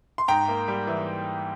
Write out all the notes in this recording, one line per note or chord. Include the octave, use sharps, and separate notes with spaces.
C6
G#2 G5 A#5
A#3
G3
E3